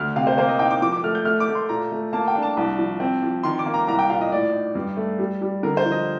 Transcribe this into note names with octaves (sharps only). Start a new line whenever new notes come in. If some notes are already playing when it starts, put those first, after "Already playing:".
Already playing: D2 F6
C3 F5
C5
A#3 C5
D#5
D#4 G5
D6
F3 D6
D6
A3 F6
G6
A3 F6
D6
A3
C6
A#2 A#5
A3
A#3 A5
G5
D4
A5
C2
F3
C4
F3
D#3 C6
D6
A#3
A#5
C2 A#5
G5
A#2 F5
D#5
A2 D5
D#4
G2
A3
G3
G3
D3 A#4
C5
F3
D#5